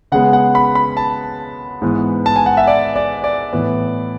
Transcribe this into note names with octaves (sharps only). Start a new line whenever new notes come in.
C#3 G#3 B3 F#5
F#5
B5
B5
A5
G#2 E3 B3
A5
G#5
F#5
E5
D5
D5
D5
A2 E3 B3